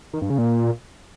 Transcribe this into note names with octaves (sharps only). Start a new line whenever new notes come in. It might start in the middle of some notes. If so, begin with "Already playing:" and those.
D#3
G2
C#3
A#2